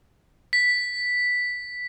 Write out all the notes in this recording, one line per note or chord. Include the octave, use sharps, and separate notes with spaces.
B6